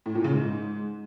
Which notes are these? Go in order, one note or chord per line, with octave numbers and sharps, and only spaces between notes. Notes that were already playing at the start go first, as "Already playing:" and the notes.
A2
A#2
C#3
G#2